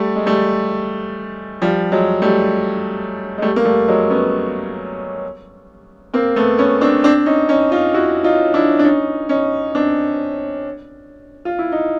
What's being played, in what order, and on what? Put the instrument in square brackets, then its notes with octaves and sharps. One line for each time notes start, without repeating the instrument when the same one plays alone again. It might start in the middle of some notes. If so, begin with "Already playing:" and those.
Already playing: [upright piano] G3 A3
G#3
G3 A3
F3 G3
F#3 G#3
G3 A3
G#3
G3 A3
A#3
G3 A3
F#3 G#3
B3 C#4
A#3 C4
A3 B3
B3 C#4
C4 D4
C4 D4
C#4 D#4
C#4 D#4
D#4 F4
E4 F#4
D#4 F4
D4 E4
D4
C#4 D#4
C#4 D#4
C4 D4
F4
E4
D#4